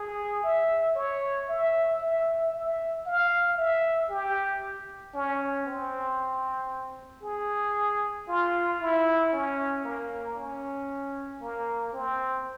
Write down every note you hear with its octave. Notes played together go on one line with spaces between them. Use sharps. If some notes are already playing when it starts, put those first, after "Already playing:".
Already playing: G#4
E5
C#5
E5
E5
E5
F5
E5
G4
C#4
C4
G#4
F4
E4
C#4
A#3
C#4
A#3
C4